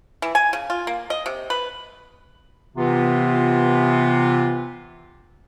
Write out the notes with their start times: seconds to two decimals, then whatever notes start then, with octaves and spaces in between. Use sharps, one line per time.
0.22 E3
0.35 G#5
0.53 C#3
0.70 F4
0.87 A#3
1.10 D#5
1.26 C3
1.50 B4
2.77 C3 E3 B3 F4